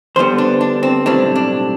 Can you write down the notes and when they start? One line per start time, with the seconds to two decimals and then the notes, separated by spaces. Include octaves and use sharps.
0.16 D2 D3 G3 B3 C5
0.38 D4
0.61 D4
0.83 C4
1.06 B1 A2 G3 C4 D4
1.36 D4